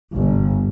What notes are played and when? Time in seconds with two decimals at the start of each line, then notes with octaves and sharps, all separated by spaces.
0.16 G1